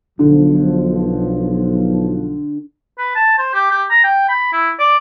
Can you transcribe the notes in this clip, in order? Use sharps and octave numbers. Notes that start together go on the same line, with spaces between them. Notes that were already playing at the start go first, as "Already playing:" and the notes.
B1 D3 F3
B4
A5
C5
G4
G4
A#5
G5
B5
E4
D5